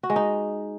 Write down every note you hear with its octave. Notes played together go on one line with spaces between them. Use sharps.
F#4
G#3
D#4